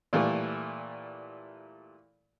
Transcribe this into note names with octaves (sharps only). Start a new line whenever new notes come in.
A#2 E3 G3 A3